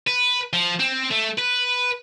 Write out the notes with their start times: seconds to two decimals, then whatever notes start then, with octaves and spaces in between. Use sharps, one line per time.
0.07 B4
0.53 F3
0.80 C4
1.11 A3
1.39 B4